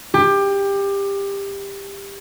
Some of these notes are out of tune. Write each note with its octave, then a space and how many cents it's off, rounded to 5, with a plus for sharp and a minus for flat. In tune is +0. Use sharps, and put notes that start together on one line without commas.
G4 +20